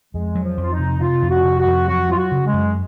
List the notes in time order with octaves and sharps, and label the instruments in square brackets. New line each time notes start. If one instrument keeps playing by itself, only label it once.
[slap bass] F2 [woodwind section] G#3
[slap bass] F#3
[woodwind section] F3
[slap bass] F2
[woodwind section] F4
D#4
[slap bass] C3
[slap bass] C3 [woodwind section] F4
[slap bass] F2
[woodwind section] F#4
[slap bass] C3
[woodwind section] F#4
[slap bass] F2
[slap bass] F#3 [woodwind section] F#4
[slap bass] F#3 [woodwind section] F4
[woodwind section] F#4
[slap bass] C#3
[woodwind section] G#3
[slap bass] F#2